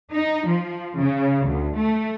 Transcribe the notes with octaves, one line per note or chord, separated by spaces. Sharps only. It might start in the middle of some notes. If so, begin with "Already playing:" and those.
D#4
F3
C#3
D2
A3